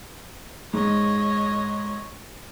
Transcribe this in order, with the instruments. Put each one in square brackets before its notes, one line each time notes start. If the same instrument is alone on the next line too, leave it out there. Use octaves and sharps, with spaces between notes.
[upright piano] G#2 [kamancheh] C#5 D#5